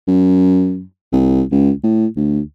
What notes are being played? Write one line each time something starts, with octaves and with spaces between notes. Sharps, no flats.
F#2
C2
C#2
A2
D2